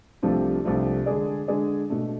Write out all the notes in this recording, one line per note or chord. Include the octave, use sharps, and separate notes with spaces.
C2 C3 F3 A3 D4
C2 C3 F3 A3 D4
D3 G#3 D4 G#4 D5
D3 G#3 D4 G#4 D5
B2 A3 D4